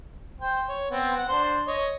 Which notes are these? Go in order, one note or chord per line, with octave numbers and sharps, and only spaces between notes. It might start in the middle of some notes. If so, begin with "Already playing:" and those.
C5 G5
C#5
B3 C4
F#5
D4 C5
C#5 D#5